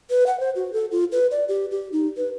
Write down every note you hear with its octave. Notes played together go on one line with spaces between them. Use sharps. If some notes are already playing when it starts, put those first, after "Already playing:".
B4
F#5
C5
F#4
A4
F4
B4
D5
G4
G4
D#4
B4